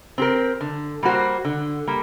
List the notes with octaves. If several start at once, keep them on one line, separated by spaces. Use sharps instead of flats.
C4 G4 A#4
D3
G3 A#3 F#4 C5
D3
G3 A#3